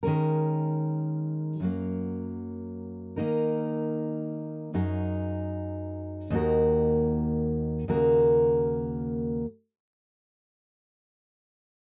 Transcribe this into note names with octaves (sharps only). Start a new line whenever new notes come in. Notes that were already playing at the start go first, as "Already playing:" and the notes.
D#3 G#3 C#4 A#4
F#2 F#3 A#3
D#3 A#3 D#4 A#4
F#2 F#3 D#4 G#4
D#2 D#3 A#3 F#4 A#4
D#2 C#3 A#3 F#4 A#4